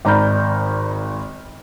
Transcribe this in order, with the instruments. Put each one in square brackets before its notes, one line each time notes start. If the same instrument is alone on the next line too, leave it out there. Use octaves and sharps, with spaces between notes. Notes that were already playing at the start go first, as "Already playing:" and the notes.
[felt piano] G#1 D5 A#5 B5 F6 G6